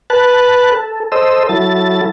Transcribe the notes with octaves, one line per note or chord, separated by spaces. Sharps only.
B4 A5 F#6
A4
A4 C5 D#5 E6
F#3 E4 A4 A6